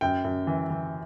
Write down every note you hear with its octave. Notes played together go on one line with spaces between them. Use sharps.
F#2 G5
F#2
E3
E3